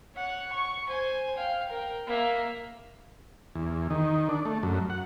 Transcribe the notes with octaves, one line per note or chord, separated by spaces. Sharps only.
C#5 F#5
C#6
C5 G#5
F5 G5
A#4 G5
A#3 E5
E2
D#3
D4
A3
F#2
F#5